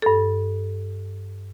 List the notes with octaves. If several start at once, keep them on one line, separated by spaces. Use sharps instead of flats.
G2 A4